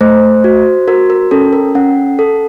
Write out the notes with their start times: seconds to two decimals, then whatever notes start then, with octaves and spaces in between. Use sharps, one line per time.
0.01 A3 C5
0.44 F#4
0.88 F#4 A#4
1.10 A#4
1.31 C#4 A4
1.53 A#4
1.75 C#4 F#5
2.19 A4